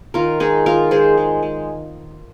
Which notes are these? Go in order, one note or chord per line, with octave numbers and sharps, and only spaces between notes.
D#3 F4 A#4
G#3 D#4 G#4
D#3 F4 A#4
G#3 G#4 C5
G#3
G#3